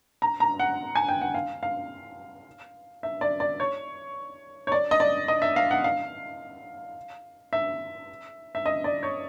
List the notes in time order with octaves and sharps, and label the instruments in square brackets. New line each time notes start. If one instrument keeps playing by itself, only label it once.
[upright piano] A#5
A#5
F#5
G#5
G5
F#5
F5
F5
E5
D5
D5
C#5
C#5
D5
D#5
D5
D#5
E5
F5
F#5
F5
E5
E5
D#5
D5
C#5